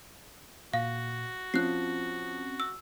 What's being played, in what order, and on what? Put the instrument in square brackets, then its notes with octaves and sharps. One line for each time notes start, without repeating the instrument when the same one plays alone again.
[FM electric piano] A#2 [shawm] F#4 [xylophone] F5
[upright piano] F3 [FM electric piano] C4 C#4 [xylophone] F#6 C7
[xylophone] E6